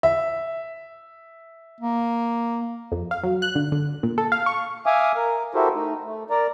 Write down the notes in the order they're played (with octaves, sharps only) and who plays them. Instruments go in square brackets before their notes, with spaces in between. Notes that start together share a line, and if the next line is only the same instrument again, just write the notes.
[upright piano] E5
[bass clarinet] A#3
[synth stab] F2
F5
F#3
F#6
D3
D3
A#2
A4
F5
C#6
[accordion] E5 F5 G#5 D6 D#6 F6
A#4
E4 F#4 G4 A4 A#4 C5
A3 D#4
A3
A#4 D5 A#5